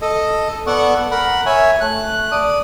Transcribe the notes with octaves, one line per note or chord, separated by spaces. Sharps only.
A4 D#5
B3 A4 D5 F#5 C#6
A#4 F#5 B5
C#5 E5 G#5
A3 F#6
D5 D#6